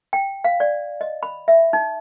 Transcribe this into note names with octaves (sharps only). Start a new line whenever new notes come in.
G5
F5
D5
D#5
B5
E5
D#4